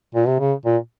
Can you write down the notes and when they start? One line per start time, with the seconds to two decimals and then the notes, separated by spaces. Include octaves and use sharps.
0.15 A#2
0.27 C3
0.40 C#3
0.66 A#2